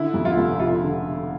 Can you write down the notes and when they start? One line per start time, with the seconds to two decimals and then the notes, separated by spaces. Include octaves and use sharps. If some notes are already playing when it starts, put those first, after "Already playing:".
Already playing: D3 E4
0.14 F2
0.25 F4
0.37 F1
0.59 F1 F4
0.83 D3